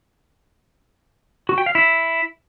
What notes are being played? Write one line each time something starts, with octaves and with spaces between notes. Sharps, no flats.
F#4
G5
F5
E4